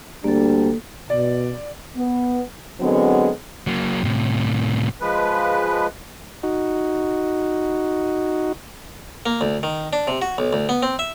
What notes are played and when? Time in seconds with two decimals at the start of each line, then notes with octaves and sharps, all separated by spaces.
0.24 D2 G3 A#3 D4 A4
1.10 B2 D5
1.96 B3
2.81 D3 F#3 G#3 B3 C4
3.67 F#3 A#3
4.04 A2 C3
5.01 F3 G#3 B4
6.43 D#4 F#4
9.26 A#3
9.41 D2
9.63 D#3
9.93 D4
10.07 C3
10.22 F#4
10.38 B1
10.53 D2
10.69 B3
10.83 C4
10.99 E5